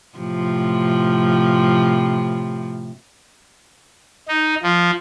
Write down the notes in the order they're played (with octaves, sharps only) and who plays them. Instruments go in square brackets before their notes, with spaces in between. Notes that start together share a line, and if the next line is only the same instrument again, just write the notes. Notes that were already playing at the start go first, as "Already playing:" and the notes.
[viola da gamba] A2 C3 F3
[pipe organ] D#4
F3